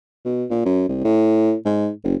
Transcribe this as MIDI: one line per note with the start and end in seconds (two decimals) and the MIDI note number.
0.25 0.45 47
0.50 0.65 46
0.65 0.85 42
0.89 1.01 36
1.04 1.54 45
1.65 1.90 44
2.04 2.16 30